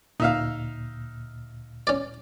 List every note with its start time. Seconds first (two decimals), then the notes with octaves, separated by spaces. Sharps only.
0.20 D2 A#2 D#4 E5 F5
1.87 C#4 D5